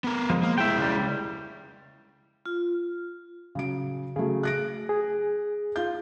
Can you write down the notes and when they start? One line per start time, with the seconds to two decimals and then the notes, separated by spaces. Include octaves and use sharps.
0.04 B3 A#4
0.30 F3 G#3
0.43 A#3
0.58 G#3 E4 E5 G5
0.78 C#2 G3
2.46 F4
3.55 C#3 F#3 D7
4.16 C#3 F#3 A3 G#4
4.43 F#6 A#6 D7
4.89 G#4
5.76 F4 G6